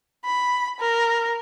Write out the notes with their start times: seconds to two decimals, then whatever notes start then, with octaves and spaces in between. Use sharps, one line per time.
0.25 B5
0.80 A#4